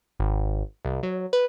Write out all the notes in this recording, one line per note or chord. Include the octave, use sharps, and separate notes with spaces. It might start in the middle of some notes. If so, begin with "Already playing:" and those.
G#1
C2
F#3
B4